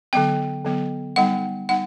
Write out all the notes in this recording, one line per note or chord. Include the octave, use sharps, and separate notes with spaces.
D3 F#3 B3 G5
D3 F#3 B3
G3 B3 D#4 F#5
G3 B3 D#4 F#5